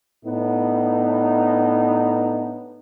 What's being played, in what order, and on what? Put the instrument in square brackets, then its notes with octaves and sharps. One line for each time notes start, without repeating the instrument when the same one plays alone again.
[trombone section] A2 B3 D4 D#4